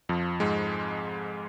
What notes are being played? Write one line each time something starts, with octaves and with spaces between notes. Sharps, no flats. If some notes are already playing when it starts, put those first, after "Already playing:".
F2 F3
G#2 G#3